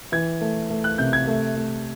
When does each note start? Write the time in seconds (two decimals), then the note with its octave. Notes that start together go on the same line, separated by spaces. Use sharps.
0.12 E3 G#6
0.41 A3
0.70 A3
0.84 F#6
0.98 C3 G6
1.13 G#6
1.27 A3
1.56 A3